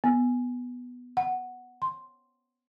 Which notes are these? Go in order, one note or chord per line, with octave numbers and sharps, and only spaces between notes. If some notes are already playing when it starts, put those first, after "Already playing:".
B3
F#5
C6